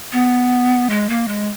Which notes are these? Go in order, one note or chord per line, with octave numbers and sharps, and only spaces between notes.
B3
G#3
A#3
G#3